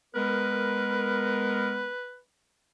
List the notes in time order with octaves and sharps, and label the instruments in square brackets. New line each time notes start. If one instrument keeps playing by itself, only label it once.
[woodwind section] G#3 B3 A#4 [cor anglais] B4